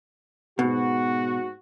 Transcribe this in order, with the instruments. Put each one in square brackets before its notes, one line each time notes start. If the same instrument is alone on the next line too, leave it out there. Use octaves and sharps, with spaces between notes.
[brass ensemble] G#2 F#4 [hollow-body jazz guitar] B2